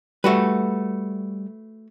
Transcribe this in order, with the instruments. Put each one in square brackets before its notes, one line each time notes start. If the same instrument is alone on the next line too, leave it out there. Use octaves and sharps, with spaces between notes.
[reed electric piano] G3 [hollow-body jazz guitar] A3 F#4 B4